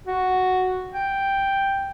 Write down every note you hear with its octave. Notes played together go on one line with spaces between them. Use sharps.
F#4
G5